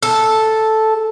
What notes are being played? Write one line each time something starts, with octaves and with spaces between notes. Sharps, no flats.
A4